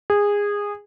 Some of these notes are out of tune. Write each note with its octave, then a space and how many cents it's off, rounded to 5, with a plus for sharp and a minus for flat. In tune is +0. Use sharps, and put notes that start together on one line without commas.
G#4 -20